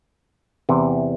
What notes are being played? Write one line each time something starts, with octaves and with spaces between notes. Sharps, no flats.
E2 C3 E3